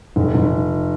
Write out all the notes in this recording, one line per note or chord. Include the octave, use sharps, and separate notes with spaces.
F1
F1